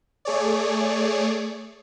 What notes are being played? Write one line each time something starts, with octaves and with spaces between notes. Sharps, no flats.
A3 G#4 C#5 D5